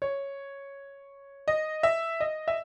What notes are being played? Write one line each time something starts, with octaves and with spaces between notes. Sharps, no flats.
C#5
D#5
E5
D#5
E5